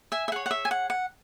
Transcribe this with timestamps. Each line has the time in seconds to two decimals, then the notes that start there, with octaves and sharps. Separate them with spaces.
0.12 E5 G#5
0.28 E5
0.32 G#4 C#5 F#5
0.46 F#5
0.51 E5
0.65 G#5
0.71 F#5
0.90 F#5